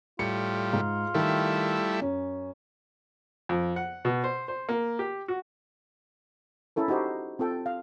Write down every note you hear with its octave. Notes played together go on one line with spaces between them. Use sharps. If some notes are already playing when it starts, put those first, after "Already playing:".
A2 G3 F4 C#7
G#2
D#3 G3 A3 E4
F#2 C#4
F2
F#5
B2
C5
C5
A#3
G4
F#4
C#4 E4 A4 A#4
D#4 F#4 G4 C5
C4 F4 A4 G5
F5